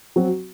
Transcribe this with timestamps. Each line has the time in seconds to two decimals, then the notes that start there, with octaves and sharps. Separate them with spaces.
0.16 F#3 C4 F#4